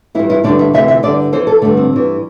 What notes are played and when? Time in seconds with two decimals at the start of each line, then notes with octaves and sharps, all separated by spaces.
0.15 E3 E4
0.19 G2
0.30 E4
0.44 G2 D3 D4
0.59 E5
0.73 D2 C3 E3 E5
0.88 E5
1.03 G2 D3 D5
1.32 E2 E3 C5
1.47 A4
1.62 D3 A3
1.65 G2
1.77 C4
1.92 G2 E3